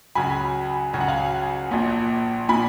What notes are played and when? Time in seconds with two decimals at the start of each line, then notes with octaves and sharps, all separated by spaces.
0.15 C#2 C#3 F#3 G#5 B5
0.93 C#2 C#3 F#3 G#5
1.01 F#5
1.08 F5 G#5
1.71 A#1 A#2 F3
2.48 A#2 F3 G#5 B5